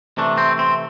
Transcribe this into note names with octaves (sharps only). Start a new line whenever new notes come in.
C3 E3 A3 D4
C4
C4